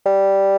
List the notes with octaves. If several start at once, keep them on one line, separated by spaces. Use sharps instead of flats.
G3